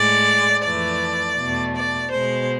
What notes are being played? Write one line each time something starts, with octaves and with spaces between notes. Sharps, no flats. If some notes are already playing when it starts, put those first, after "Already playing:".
Already playing: A2 G#3 D5
F2 E3 A3 D5
E2 B2 A3
D5
B2 G#3 C5